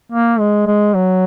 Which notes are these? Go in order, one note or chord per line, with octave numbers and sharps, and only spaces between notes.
A#3
G#3
G#3
F#3